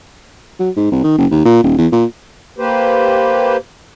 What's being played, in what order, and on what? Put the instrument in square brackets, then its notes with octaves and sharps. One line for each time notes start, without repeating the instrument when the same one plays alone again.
[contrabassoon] F#3
G#2
C2
D#3
F#1
D#2
A#2
D#1
E2
A#2
[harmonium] A#3 G4 B4 C5